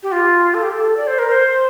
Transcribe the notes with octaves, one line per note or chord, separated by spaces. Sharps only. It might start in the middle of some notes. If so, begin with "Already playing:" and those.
G4
F4
A4
G4
A4
D5
C5
A#4
C5